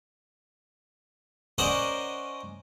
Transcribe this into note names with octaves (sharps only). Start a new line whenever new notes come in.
C#4 A#4 C5 D5 D#5 F#5